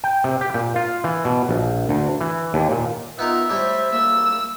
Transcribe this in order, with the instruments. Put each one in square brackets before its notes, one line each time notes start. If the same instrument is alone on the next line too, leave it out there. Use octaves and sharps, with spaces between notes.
[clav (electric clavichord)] G5
C3
G4
A#2
F4
E3
B2
A#1
D2
E3
D#2
A#2
[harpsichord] B3 D#4 A#4 [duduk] F4 [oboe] E5
[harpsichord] A2 G3 E4 [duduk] C5
[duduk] A#3 [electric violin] E6